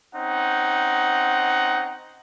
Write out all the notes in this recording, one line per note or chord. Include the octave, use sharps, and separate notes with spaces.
C4 C#4 D#4 F#5